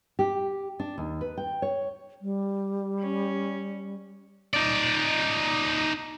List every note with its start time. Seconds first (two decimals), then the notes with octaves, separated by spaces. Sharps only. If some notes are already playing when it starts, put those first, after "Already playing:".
0.19 G4
0.80 D4
0.98 D#2
1.21 B4
1.37 G5
1.62 C#5
2.22 G3
2.99 C#4
4.54 D#4 D5